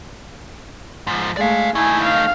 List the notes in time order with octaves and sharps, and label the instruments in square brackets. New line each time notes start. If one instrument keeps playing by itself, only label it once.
[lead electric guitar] G#2 F3
[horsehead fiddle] G#3 A3 [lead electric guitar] D5 F5
[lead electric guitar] A3 D#4 [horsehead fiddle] E4 G#5
[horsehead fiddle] F5